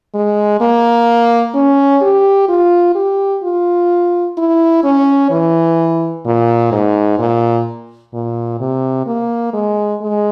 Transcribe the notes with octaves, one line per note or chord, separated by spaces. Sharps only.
G#3
A#3
C#4
G4
F4
G4
F4
E4
C#4
E3
A#2
G#2
A#2
A#2
C3
A#3
G#3
G#3